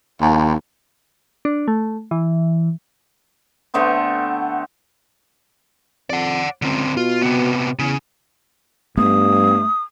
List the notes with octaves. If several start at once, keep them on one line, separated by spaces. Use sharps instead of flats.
D#2
D4
A3
E3
D3 A3 B3 C4
F2 D5 F#5
C#2 D3 C4
B2 F4
C3 B3
E2 C#3
G2 A3 B3 D#6